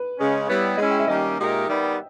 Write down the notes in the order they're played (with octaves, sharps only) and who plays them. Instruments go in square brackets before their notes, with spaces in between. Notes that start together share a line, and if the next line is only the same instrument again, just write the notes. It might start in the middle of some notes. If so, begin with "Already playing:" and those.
Already playing: [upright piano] B4
[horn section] C#3 G#3 C#4
[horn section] G3 B3 E4 [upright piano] C#5
[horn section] G#3 C#4 E4 [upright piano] D#5
[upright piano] G5
E5
[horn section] D#3 G3 A#3 C#4 G4 [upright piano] D#5
[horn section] A#2 G#3 D#4 G4 A#4
D#3 G3 B3